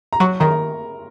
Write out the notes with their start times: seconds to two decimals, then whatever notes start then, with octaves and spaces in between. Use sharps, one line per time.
0.13 A#5
0.20 F#3 C#5 C#6
0.40 D#3 A#4 A#5